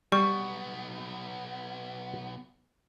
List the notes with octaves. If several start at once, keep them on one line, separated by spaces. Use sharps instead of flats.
B1 G3 B3 C#6